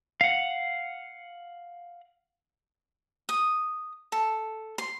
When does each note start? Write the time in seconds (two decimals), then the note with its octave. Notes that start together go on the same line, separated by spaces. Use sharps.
0.21 F5 F#5
3.29 D#6
4.12 A4
4.78 C6